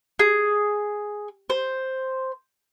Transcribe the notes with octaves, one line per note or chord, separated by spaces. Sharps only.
G#4
C5